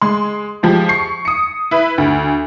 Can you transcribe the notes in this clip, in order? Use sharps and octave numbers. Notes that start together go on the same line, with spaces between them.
G#3 C6
F3 G#3 G4
C#6 C7
D#6 C#7
E4 B4
D2